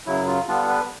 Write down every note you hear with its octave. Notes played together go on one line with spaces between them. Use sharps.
F#2 C#3 F#3 E4
F4
D3 G3 B3 D4 F4
B4